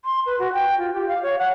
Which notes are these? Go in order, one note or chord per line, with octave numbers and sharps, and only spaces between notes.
C6
B4
F#4
G5
F4
G4
F5
C#5
F#5